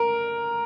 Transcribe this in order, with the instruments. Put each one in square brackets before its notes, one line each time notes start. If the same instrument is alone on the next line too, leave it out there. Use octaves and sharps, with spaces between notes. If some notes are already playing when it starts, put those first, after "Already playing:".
Already playing: [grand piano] A#4